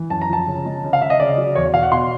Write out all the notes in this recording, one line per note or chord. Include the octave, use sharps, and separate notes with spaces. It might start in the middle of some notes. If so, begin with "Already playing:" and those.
Already playing: E3
F#2 A5
A#5
F3 A5
C#3
G#3
C#3
F5
C#3 E5
D#5
C#3 D5
F#3
E2 C#5
B2 F5
F#5
B2 C6